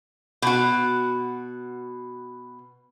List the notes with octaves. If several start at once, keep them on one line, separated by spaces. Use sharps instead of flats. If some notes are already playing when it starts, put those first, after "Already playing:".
B2 F#4